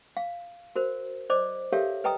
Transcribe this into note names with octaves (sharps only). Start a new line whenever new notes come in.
F5
F#4 A#4 C5
C5 D5 D#5 D6
G4 A4 A#4 C#5 E5 F5
B4 D#5 G5 A#5 D#6